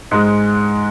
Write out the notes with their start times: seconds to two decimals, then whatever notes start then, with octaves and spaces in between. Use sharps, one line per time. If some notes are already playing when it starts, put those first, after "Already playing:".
0.11 G#2 G#3